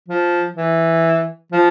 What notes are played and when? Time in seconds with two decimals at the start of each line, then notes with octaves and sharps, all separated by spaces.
0.08 F3
0.56 E3
1.52 F3